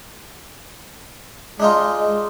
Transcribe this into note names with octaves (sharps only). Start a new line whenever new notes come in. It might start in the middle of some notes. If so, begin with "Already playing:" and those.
G#3 D4 D#4 F4